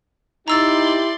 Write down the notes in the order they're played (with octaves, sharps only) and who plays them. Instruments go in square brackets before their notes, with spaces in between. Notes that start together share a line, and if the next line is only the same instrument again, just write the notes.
[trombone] D#4 [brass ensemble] E4 G4 [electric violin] D5 C6 [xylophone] A#5 E6 A6